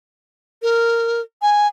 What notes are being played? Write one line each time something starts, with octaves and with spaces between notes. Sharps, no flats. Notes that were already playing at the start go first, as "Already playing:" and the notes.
A#4
G#5